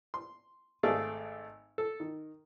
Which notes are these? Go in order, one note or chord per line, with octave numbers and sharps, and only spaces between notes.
C6
G#1 A3 G#4 D5 F5
A4
D#3